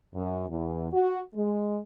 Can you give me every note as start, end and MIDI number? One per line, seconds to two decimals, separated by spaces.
0.14 0.46 42
0.49 0.88 40
0.93 1.20 66
1.35 1.79 56